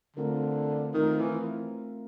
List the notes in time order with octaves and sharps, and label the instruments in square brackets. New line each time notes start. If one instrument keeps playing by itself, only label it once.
[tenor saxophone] D3 [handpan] A3 C4 F4 A#4
[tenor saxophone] D#3 [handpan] A3 C4 F4 A#4
[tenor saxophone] E3